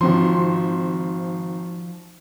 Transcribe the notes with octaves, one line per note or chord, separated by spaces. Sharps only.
G#1 F3 C4 C6